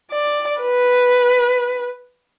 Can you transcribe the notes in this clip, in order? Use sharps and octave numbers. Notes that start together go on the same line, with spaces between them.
D5
B4